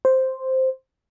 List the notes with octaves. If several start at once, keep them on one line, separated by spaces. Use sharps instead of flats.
C5